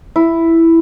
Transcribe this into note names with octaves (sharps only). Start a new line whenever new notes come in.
E4